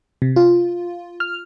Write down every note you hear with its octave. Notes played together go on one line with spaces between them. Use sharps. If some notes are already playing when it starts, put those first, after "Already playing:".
C3
F4
F6